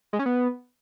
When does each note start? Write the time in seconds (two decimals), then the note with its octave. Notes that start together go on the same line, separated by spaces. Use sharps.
0.13 G#3
0.19 C#4
0.26 B3